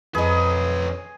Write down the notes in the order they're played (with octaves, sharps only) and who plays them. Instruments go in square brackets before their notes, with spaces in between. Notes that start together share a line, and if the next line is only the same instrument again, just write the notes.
[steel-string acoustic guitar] F2 D#5 [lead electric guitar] C#4 B4 [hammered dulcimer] G#4